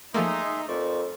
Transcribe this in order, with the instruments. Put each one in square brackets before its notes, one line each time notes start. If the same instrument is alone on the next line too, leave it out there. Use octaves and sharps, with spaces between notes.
[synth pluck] F3 A3 A#3 [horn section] D#4 [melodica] G#4 E5 C6
[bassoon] F2 [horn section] A#4 D5 [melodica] C5 C#6